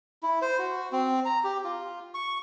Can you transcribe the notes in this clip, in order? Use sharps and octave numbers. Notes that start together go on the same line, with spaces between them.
E4
C5
F#4
C4
A#5
G4
F4
C#6